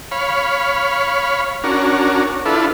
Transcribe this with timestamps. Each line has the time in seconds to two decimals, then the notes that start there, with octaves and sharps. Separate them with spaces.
0.11 C#5 F5 B5
1.64 C#4 D4 F#4 A#4
2.45 D4 E4 F4 A4 B4